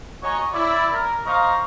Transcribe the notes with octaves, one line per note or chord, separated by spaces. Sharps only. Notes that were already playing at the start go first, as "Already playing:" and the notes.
F#4 C#5 D#5 G#5 A#5 C#6
E4 D5
A#4
C5 D#5 F5 A#5 C#6